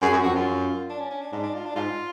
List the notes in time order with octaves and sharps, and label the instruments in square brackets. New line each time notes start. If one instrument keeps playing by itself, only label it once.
[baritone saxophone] F#2 [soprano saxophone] G#4
[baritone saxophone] F#2 [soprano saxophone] F#4
[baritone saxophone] F2 [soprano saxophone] F#4
[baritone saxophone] F#2 [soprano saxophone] F4
[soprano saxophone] D4
C#4
C#4
D4
[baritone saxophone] G#2 [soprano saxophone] D4
[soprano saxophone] D4
F4
D4
[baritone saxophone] G#2 [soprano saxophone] F4